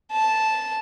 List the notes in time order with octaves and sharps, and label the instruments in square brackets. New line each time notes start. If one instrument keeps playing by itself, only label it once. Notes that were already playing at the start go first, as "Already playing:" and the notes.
[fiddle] A5